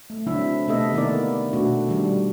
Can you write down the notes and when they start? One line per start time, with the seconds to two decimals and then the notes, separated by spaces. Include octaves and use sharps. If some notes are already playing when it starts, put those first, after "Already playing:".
0.10 A3
0.26 D3 F#3 C4 D4 E4 E5
0.67 C3 A3 B3 A4 D#5 E5
0.93 D#3 A#3 B3 E4 A#4 D5
1.53 B2 A3 D4 F#4
1.89 D#3 G3 D4